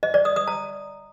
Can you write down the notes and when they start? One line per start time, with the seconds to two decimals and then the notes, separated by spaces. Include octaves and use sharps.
0.03 D#5
0.14 D5
0.25 D#6
0.36 D#6
0.48 A#5